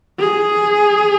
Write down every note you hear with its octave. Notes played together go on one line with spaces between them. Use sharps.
G#4